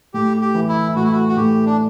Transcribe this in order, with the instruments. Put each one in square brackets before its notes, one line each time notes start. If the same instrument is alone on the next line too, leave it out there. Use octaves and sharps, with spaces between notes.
[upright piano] A2 [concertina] G4
[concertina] G4
[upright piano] E3
[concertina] E4
[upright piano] A2 [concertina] F#4
[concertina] E4
F#4
F#4
[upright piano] A2 [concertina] G4
[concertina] D4